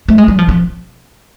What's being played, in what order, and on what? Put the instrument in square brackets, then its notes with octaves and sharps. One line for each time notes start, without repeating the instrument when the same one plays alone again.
[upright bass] A3
G#3
G3
F3
F3